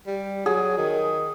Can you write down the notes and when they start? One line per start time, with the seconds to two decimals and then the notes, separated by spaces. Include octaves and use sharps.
0.07 G3
0.46 F#3 G#4
0.78 D#3